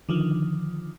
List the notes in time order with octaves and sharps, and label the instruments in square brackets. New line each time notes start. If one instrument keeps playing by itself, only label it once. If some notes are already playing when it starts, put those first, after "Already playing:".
[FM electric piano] D3 D#3 F3